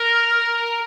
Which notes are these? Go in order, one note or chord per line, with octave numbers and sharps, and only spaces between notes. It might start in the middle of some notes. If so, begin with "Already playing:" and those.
Already playing: A#4